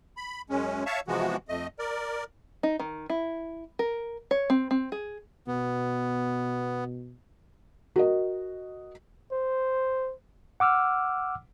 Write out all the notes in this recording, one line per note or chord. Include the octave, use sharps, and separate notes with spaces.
B5
F#2 G#3 C#4
C#5 E5 F5 A5 C#6
C3 E3 F3 G#3 B3 F#4
F2 A3 D#5
A#4 D5
D#4
D#3
E4
A#4
C#5
C4
C4
G#4
B2 B3
F#4 A#4 D#5
C5
F#5 D6 E6 F6